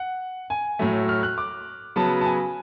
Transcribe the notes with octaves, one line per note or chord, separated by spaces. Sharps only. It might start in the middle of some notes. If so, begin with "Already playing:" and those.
Already playing: F#5
G#5
A2 F#3 A3
F6
F#6
D6
C#3 F#3 B3 A5
A5
G#5